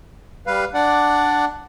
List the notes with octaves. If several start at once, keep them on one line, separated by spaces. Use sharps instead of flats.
G3 B4 F5
D4 D5 F#5